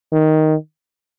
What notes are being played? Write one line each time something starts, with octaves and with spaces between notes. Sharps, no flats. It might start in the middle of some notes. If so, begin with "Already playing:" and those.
D#3